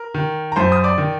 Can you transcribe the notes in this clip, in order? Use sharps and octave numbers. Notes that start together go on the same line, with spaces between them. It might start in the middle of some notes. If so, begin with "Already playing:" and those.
Already playing: A#4
D#3
A#5
F#2 C5 C6
D#6
D5 D6
D#3